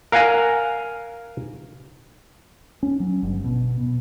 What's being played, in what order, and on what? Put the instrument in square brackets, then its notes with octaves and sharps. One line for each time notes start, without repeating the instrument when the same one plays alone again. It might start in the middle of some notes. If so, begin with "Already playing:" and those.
[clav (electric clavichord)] A#4 F5 F#5 G#5 A#5
[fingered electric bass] C#4
F#3
G1
B2
B2